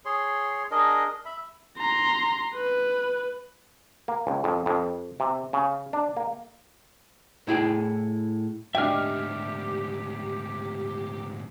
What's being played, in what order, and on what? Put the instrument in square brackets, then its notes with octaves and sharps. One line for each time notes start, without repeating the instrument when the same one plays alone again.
[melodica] G#4 C#5 C6
D4 G#4 A#4 D#5
E5 B5
[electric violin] A#5 C6
B4
[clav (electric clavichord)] A#3
C#2
F2
F2
C3
C#3
D4
A#3
[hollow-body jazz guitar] A2 E4 G#4 G5
[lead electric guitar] D2 G#2 [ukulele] D4 D#5 G5 [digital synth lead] G4 [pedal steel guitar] E5 F6